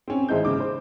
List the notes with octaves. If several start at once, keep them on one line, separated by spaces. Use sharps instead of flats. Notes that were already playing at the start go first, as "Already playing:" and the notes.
C4 C#4
G#1 G#3 E4 G6
C#3 D6
C5